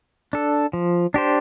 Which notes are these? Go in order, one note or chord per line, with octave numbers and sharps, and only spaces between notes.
D4 A4
F3
D4 G4 C5